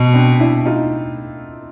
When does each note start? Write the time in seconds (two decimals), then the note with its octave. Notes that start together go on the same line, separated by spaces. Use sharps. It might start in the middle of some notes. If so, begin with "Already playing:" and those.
Already playing: B2
0.14 C4 D4
0.40 D4 E4
0.66 D#4 F4